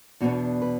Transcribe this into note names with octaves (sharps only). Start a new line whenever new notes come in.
E2 B2 B3 D4 F#4
B4